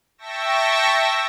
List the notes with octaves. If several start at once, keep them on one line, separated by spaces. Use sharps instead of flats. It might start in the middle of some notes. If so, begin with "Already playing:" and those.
E5 G5 A5 C#6 E6 A#6